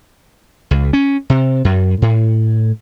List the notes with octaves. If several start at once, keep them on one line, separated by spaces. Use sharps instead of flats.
C#2
C#4
C3
F#2
A2